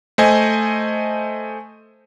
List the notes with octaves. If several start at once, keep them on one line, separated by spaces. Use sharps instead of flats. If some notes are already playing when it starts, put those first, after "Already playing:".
A3 C5 D#5 G#5